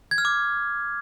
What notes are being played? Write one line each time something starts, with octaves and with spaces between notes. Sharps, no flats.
G#6
F6
D6